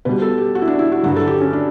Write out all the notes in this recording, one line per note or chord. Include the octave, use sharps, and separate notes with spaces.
B2 G3 B4
A4
G4
F#4
E4
D4
E4
F#4
G2 D3 F#3 F#4
A4
G4
C#4
D4